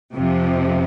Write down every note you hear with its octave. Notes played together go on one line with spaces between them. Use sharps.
F2 C3 F3